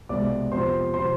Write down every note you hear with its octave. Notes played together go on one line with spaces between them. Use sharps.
C2 B2 G#3 B3 D5 D6
F2 C3 F3 B3 C5 C6
C3 F3 C5 C6